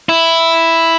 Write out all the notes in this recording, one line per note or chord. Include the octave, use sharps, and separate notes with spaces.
E4